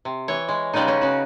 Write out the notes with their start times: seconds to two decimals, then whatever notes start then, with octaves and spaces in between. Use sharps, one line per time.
0.05 C3
0.28 E3 C#5
0.49 G#3
0.73 C#3 G3 G#3 B3 D#4
0.88 C#4
1.01 C#3 F#4